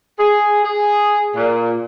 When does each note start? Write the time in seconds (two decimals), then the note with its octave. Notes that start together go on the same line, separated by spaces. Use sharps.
0.18 G#4
0.64 G#4
1.35 A#2